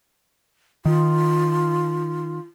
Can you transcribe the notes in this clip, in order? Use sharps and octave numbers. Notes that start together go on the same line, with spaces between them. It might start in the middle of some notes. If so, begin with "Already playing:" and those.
D#3 F4